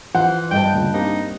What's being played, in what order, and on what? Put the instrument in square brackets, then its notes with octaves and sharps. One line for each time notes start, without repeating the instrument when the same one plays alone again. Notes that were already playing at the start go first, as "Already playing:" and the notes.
[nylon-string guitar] E3 [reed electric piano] F3 [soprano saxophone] C5 [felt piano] F#5
[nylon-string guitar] G2 D#5 A5 [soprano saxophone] G5
[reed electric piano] D2 A#2 C#3
[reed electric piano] A#3 C4 G4 [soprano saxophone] D#4